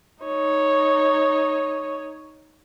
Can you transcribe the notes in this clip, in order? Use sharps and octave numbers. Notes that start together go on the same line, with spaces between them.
D#4 C#5